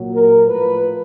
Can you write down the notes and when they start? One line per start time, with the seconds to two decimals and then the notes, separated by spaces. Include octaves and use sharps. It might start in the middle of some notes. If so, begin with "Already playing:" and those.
Already playing: A#2 F#3
0.13 A#4
0.46 A2 F3 B4